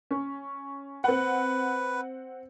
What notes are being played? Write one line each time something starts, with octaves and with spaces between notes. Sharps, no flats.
C#4
C4 B4 F#5